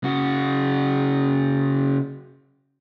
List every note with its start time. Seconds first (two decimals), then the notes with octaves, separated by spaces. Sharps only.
0.04 C#3 F#4